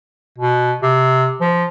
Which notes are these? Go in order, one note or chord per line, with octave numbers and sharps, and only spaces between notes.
B2
C3
F3